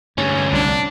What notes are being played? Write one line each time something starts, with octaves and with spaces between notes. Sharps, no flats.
D2 G2 C#4
C2 D4